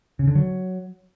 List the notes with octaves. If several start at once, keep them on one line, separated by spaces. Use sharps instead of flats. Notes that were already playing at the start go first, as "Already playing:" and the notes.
C#3
D3
F#3